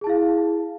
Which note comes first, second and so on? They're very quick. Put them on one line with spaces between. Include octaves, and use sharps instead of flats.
G#4 A5 E4 F5